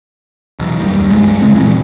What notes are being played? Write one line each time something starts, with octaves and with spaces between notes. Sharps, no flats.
B1 E2
F#1 G3
D#2
C#2 G2 G#3
C#3 G#3 C4
E2 A#2 C#3 E3